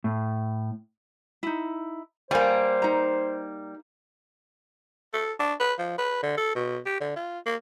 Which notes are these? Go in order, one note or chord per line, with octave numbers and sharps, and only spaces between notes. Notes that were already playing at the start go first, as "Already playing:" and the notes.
A2
D#4 E4
G3 A#3 C5 G#5
D#4 A#5
A4
D4
B4
F3
B4
D3
A4
B2
G4
D3
F4
A#3